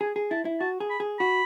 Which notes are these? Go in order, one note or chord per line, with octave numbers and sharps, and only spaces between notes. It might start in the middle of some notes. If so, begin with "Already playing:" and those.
G#4 G#5
G#4
E4 A5
E4
F#4 A5
G#4
B5
G#4
F#4 B5